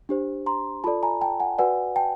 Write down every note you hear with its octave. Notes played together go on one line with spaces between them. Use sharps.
D4 G4 C5
A#5 C6
F4 A4 D5 A5 B5
G#5 A#5
G5 A5
F#5 G#5
F#4 B4 D5 F#5 G#5
G5 A5